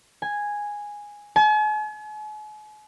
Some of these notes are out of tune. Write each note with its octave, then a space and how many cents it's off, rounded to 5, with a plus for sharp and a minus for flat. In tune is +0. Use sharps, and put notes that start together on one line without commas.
G#5 -5
G#5 +45